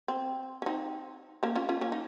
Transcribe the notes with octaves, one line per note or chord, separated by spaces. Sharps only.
C4
C#4
C4 D#4
A#3 C#4
C#4 F4
C#4 F4
A#3 C#4
D#4